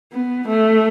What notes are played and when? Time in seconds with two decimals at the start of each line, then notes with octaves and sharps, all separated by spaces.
0.12 B3
0.49 A3